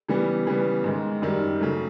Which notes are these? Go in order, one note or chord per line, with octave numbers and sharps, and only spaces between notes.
C#3 E3 G3 B3
C#3 E3 G3 B3
G#2 D#3 G#3
F#2 D#3 G3
C#3 F#3 A3